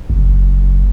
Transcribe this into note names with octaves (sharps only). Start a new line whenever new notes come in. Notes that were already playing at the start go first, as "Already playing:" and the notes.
F#1